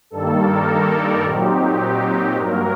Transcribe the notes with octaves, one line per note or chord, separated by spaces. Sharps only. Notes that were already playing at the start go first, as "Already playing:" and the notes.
G2 D#3 G3 A#3 A4
A#4
D5
A#2 F#3 C4 D#4 G4
G4
G2 F#3 A#3 A#4